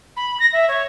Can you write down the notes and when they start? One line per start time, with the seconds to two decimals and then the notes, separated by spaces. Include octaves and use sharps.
0.16 B5
0.39 A#6
0.52 E5
0.68 C#5